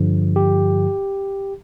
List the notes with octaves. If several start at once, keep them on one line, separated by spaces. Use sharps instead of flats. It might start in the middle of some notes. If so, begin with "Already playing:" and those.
Already playing: G2 D3 F3
G4